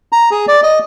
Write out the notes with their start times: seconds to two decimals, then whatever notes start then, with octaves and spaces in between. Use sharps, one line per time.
0.12 A#5
0.31 G#4
0.48 D5
0.63 D#5